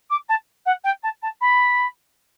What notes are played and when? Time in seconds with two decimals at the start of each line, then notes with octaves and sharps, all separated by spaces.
0.09 D6
0.28 A5
0.65 F#5
0.84 G5
1.02 A5
1.22 A5
1.41 B5